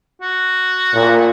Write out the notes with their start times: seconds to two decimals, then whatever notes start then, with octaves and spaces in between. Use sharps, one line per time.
0.21 F#4
0.94 A#2